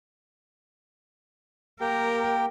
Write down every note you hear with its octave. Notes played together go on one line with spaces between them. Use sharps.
A#3 G4 A#4 G5